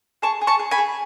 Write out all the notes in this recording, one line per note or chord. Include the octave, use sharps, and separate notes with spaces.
G#4 A5 C#6
G#4
A5 C#6
G#4
G#5 B5
G#4